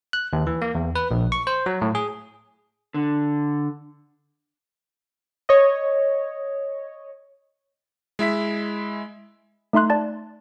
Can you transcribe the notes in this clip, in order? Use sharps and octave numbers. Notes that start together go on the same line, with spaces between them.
F#6
D#2
E3
A#3
E2
B4
A#1
C#6
C5
F#3
A2
G#4
D3
C#5 D#5
G#3 E4 E5 B6
A3 D#4 E5 C6 F#6
D5 A5 A6